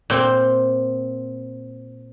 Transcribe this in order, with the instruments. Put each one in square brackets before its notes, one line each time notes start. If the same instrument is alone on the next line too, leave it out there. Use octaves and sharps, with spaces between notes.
[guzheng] A#2 C4 G5